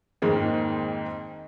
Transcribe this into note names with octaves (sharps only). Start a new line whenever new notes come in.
F2 G#2 D#3 G#3 A#3 C4